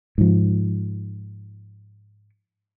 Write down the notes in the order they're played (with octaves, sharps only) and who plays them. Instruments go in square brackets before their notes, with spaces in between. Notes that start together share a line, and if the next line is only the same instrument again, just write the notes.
[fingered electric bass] G#2 F3